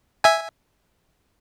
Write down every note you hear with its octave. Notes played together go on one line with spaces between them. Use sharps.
E5 G#5